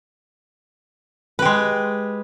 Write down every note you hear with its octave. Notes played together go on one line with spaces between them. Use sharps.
G#3 G4 B4